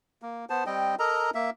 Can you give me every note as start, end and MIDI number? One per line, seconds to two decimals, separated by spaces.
0.22 0.45 58
0.50 0.64 59
0.50 0.64 72
0.50 0.64 81
0.66 0.95 55
0.66 0.95 60
0.66 0.95 75
0.66 0.95 79
0.99 1.30 69
0.99 1.30 70
0.99 1.30 75
0.99 1.30 82
1.35 1.50 58
1.35 1.50 76